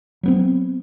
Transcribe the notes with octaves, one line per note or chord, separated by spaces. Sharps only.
F#3 B3 C4